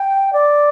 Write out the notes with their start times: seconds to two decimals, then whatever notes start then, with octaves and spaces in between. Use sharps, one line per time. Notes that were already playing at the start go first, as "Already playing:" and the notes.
Already playing: G5
0.33 D5